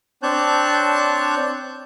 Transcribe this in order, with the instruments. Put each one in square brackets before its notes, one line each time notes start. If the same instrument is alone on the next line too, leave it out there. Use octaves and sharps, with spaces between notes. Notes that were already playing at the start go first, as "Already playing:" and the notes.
[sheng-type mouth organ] C4 D4 C#5 A5 F#6 G6